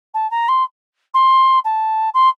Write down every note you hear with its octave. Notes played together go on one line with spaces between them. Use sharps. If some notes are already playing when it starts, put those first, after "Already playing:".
A5
A#5
C6
C6
A5
C6